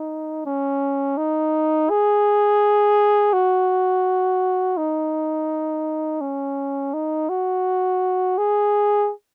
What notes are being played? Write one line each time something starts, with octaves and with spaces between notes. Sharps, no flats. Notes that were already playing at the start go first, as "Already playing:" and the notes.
Already playing: D#4
C#4
D#4
G#4
F#4
D#4
C#4
D#4
F#4
G#4